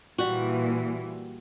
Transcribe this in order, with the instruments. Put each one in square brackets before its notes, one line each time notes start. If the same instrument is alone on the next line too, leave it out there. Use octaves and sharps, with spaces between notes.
[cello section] A#2 E3 [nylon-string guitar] G3 F#4